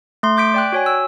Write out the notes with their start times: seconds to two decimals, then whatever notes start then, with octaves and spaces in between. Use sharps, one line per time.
0.23 A3 C6
0.37 D6 G6 B6 D7
0.54 D5 G5 F#6
0.72 F#4 C#5 G#5
0.86 E6